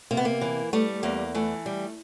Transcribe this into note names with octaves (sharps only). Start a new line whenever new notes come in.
C3 A#3
B3
A#3
E3
G3 A3
E2 A#3
E3 A3
G3